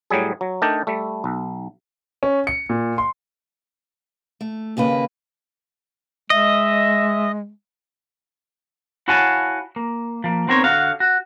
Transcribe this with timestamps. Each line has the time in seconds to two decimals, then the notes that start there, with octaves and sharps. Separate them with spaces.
0.10 A2 F#3 G3 G#4
0.41 F#3
0.62 A3 D4 D#4 A#4 D5 G5
0.87 G3 A3
1.24 B1
2.23 C#4
2.47 C#7
2.69 A#2
2.98 C6
4.41 A3
4.77 D#2 C#3 A#3 B4
6.30 G#3 D#5 E5
9.08 E4 F#4 C#5 F5 G#5 A5
9.76 A#3
10.24 F3 A#3
10.48 B3 C4 D#4 A#4 C5 C#5
10.64 D3 F#4 F5
11.00 F#4